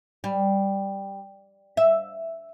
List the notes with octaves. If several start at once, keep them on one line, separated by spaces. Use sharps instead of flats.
G3
E5